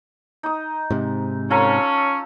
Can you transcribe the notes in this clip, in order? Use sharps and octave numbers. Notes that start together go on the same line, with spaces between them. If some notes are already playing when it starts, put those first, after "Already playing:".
D#4 D#6
G#2 C3
C#4 F4 A4 A#5